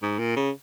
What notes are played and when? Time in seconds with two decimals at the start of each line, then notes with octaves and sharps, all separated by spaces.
0.02 G#2
0.19 A#2
0.36 C#3